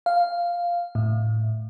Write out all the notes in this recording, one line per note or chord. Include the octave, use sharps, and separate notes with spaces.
F5
A2